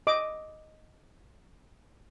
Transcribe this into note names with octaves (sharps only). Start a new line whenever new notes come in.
D#5 D6